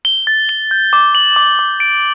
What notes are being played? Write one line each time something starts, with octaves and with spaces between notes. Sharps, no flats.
G7
A6
G7
G6
D6
F#7
D6
D6
D7